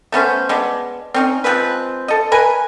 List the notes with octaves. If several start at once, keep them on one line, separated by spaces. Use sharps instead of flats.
A3 B3 C#4 C5
G#3 B3 D4
C4 C#4 D#4
F3 G#3 C4 B4
A4 D#5
A#4 B4 G#5